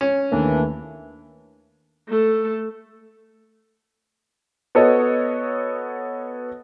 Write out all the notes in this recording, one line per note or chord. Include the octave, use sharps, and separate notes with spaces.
C#4
D#2 E3 A3 A#3 D4
A3 A4
B3 F#4 A4 C#5 D#5